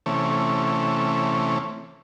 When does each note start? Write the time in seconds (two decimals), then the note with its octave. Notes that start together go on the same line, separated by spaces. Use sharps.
0.06 C3 E3 A3 C#4